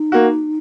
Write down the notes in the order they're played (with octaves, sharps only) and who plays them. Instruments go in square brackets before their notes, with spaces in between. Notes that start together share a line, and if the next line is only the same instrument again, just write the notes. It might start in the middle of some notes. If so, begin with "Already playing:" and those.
Already playing: [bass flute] D#4
[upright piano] A#3 F#4